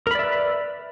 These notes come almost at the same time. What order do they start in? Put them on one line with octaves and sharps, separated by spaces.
A#4 B5 D5 E5 B4